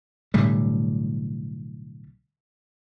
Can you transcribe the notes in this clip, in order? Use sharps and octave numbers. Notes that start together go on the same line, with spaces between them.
B1 A2 D3 G3